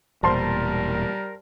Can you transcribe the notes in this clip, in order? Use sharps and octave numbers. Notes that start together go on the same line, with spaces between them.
E1 A#2 G3 A#4 C5 A5 C6